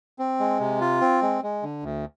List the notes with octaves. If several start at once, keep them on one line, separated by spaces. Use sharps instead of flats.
C4
G#3
C3
F4
C4
G#3
G#3
D3
D2